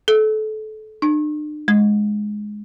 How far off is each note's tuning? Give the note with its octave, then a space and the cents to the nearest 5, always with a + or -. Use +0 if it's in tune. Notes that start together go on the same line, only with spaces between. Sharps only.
A4 -25
D4 +45
G#3 +5